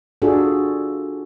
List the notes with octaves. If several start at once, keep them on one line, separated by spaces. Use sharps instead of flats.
D4 F4 F#4 G#4 A4